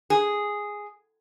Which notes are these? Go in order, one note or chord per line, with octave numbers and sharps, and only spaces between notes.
G#4